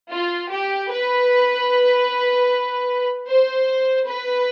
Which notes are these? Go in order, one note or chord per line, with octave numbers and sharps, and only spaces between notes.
F4
G4
B4
C5
B4